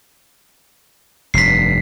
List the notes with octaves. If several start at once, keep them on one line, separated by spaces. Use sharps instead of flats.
F1 G2 B6 C7